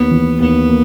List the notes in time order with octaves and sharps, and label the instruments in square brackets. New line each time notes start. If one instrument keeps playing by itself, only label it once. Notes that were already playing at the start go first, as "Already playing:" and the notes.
Already playing: [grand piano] D#2 [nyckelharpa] B3
[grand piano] E3
[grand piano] D#2 [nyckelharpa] B3
[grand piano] A#3